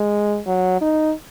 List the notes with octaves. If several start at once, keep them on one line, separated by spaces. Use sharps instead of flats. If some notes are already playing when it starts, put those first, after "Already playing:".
Already playing: G#3
F#3
D#4